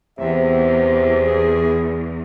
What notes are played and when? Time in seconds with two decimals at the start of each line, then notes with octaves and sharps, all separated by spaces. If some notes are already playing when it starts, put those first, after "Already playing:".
0.19 E2 C3 E5
1.27 G#4